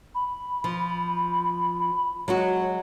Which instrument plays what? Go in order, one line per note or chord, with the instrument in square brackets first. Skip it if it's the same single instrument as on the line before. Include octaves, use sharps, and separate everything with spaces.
[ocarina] B5
[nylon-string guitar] F3
[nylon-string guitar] F#3 G#3 F#4 [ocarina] C#5